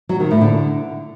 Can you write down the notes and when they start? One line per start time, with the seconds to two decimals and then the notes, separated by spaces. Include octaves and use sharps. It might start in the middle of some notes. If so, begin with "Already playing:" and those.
0.09 F#3
0.20 D#3
0.31 A2
0.41 D3